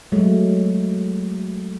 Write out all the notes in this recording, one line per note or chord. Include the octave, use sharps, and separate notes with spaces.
F#3 G#3 A3